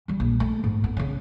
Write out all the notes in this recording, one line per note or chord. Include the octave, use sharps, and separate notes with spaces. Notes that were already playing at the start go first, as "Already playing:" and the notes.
E3 G3
A#1
A3
G#2
B3
C#3 C#4